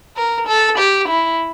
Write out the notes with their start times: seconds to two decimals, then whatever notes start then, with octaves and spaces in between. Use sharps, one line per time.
0.16 A#4
0.47 A4
0.78 G4
1.08 E4